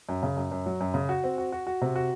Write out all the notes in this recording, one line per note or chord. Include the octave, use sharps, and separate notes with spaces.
F#2
C#3
F#2
F#2
F#3
F#2
C#3
F#4
C4
F#4
F#4
F#4
C3
F#4